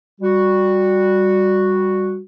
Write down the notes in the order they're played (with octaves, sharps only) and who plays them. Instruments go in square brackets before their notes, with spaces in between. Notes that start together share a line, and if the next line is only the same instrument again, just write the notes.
[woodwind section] G3 F#4